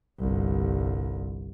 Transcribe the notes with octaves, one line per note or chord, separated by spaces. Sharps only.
G1 C2